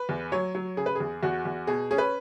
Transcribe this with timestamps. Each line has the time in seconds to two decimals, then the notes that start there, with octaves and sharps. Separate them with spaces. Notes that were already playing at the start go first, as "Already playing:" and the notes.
Already playing: B4
0.09 E2
0.32 F#3 C#5
0.55 F#3
0.77 C#3 G#4
0.86 B4
0.95 E2 G#4
1.23 E2 F#4
1.45 E2
1.67 B2 G#4
1.91 C#4 G#4
1.98 B4